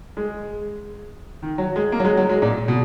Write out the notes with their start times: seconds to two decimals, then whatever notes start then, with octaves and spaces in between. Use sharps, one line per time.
0.17 G#3
1.43 D#3
1.58 F#3
1.76 G#3
1.92 A#3
2.00 F#3
2.05 G#3
2.17 F#3
2.29 G#3
2.42 A#2
2.68 B2